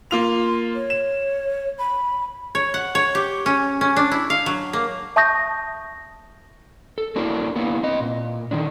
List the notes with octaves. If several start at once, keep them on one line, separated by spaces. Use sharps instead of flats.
A#3 F4 C6 F7
C#5
E7
B5
C#5
F#5
C#5
G4
C#4
C#4
D4
E4
F5
F#3
A#3
E5 A5 C#6 D#6 G6 A#6
A4
A#3 D4 E4 F#4 A#4
A#3 B3 E4
C4 D#5
A#2
D3 D#3 G#3 D4